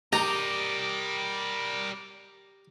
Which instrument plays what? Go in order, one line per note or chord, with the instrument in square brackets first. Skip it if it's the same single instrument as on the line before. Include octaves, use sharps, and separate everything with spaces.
[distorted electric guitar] G3 D#5 [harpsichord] G4 [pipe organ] A#4 D6 [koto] A#5